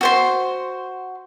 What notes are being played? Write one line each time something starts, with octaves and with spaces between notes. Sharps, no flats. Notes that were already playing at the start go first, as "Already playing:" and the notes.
F#4 C5 C6